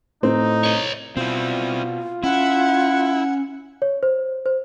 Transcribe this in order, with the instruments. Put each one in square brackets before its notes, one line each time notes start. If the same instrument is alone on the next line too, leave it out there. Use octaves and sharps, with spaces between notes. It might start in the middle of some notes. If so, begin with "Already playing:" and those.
[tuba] A2 [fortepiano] C4 [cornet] D#4
[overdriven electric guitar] C#5 D#5
[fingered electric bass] B2 [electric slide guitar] C4 E4 [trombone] F4
[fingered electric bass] C#4 [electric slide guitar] E4 [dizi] F#5
[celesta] C#5
C5
C5